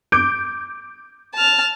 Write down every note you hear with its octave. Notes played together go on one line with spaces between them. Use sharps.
D6 G6 D7
A5 F6